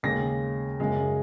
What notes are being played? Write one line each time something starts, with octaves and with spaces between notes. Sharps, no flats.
D#2 C#3 G#3 A#6
F#2 C#3 G#3